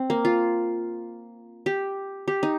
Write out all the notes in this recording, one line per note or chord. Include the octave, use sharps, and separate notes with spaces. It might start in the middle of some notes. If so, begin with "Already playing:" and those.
Already playing: C4
A#3
F4
G4
G4
D#4